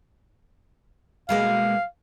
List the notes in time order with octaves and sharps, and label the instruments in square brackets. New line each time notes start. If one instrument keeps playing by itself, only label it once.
[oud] B2 G#3 A#3 [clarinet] F5